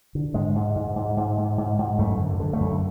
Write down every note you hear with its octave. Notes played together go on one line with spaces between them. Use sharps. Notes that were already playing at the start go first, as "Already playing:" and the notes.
D3
G#2 G#3
G#2
G#2
G#2
G#2
G#2
G#2
G#2
F#2 A3
D3
D3
A3
F#2